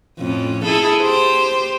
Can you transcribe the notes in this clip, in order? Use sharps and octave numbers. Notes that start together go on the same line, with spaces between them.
F2 A2 C#4
E4 G#4 A4
G4 C5